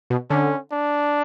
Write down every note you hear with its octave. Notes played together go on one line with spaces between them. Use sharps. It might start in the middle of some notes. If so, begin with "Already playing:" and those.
B2
D3 C#4
D4